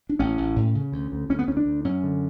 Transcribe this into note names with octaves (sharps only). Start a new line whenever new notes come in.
D4
A1 C#4
A1
A2
C#3
D2
D2
D2 C#4
B3
D2 C#4
D4
D2
F#2 C#4
D3